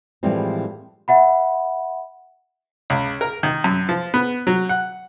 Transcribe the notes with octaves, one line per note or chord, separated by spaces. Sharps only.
A2 E3 F3 G3 G#3 C4
E5 F#5 B5
C#2
A#4
D#3
F#2
F3
B3
F#3
F#5